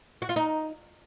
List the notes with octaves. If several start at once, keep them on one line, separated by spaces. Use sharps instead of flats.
F#4
F4
D#4